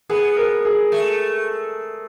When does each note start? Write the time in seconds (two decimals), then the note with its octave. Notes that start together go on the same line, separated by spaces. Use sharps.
0.10 B3 G#4
0.37 A#4
0.65 G#4
0.92 A3